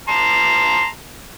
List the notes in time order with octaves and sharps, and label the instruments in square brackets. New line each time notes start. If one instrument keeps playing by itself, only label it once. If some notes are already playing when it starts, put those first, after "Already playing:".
[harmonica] A5 A#5 C6